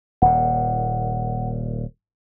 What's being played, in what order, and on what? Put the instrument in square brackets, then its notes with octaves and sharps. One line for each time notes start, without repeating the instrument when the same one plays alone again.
[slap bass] D#1 A#2 [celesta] F#5